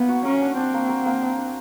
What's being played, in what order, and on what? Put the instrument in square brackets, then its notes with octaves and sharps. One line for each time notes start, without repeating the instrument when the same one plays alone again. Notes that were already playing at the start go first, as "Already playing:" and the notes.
Already playing: [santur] A#3 [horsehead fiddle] B3
[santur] F#4
[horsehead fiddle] C#4 [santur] A#4
[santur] D4
[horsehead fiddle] C4 [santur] D4
[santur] A#3
A#4
A#3
D4
D4